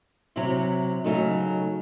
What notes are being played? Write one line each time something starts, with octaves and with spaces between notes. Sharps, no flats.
C3 F#3 C4 E4
C#3 F#3 A3 D#4